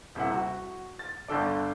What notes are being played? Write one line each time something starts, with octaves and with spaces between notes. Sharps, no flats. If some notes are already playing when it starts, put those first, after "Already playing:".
D#1 C3 E4 F#5
F#4
A6
G1 D3 A4 D5